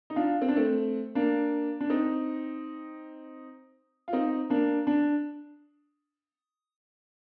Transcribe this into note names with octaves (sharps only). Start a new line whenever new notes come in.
D#4
D4 F4
C4
D4
A3 C4
A#3 D4
D4
C4 D#4
F4
C4 D#4
A#3 D4
D4